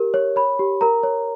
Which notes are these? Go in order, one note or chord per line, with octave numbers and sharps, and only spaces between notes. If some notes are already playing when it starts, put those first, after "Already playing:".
Already playing: G4 A#4
C#5
C#5 B5
G4
A#4 A#5
C#5